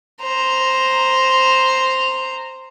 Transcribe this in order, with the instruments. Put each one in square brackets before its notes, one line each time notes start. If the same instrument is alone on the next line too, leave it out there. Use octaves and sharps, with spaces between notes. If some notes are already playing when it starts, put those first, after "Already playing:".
[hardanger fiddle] C5 A#5